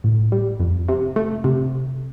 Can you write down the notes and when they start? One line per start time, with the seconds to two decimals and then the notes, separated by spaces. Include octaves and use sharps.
0.04 A2
0.32 G3
0.60 F2
0.89 C3
1.16 A3
1.44 C3